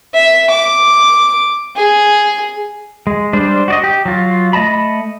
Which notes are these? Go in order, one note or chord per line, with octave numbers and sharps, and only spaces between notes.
E5
D6
G#4
G#3
G3 D4 C5
F#4 D5 D#5
G4
F#3 F4
A3 D#5 A5 B5